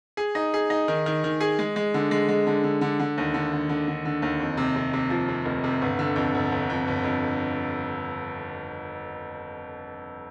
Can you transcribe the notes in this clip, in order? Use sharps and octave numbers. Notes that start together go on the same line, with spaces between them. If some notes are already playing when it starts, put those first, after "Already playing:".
G#4
D#4
G#4
D#4
D#3
D#3
D#3
G#4
G#3
G#3
D3
G#3
G#3
D3
D3
D3
D3
D#2
D3
D3
D3
D3
D3
D#2
F2
C3
C3
C3
F3
C3
F1
C3
G1
D3
F2
G1
G1
F2
G1
F2